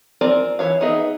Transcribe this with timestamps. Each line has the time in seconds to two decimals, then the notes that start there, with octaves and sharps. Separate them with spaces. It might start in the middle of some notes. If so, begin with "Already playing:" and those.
0.21 C4 F4 A#4 D5 G#5
0.59 E3 C#5 F5
0.81 B3 D#4 G#4 D#5 E5